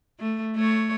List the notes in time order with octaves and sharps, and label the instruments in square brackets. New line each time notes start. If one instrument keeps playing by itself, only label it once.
[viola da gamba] A3
A3 C#5